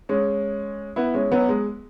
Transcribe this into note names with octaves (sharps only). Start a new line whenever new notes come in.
G#3 C#4
B3 E4
G#3 C#4
F#3 B3
G#3